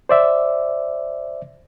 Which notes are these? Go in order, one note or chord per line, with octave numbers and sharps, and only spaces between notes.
C5 D5 E5